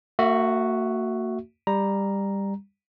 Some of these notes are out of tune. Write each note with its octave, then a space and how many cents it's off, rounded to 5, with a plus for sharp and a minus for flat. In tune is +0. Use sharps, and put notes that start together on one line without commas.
A#3 -40 F#4 +0 E5 +0
G3 +15 A#5 +5